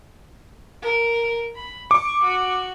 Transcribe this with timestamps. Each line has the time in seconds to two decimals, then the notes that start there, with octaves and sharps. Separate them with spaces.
0.83 A#4
1.56 B5
1.91 C#6 D6
2.24 F#4